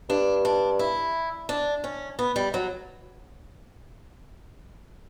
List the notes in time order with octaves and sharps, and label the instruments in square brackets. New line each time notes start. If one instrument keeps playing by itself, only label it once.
[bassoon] G2 [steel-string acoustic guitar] D4
[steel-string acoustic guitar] D4
E4
D4
C#4
B3
G3
F#3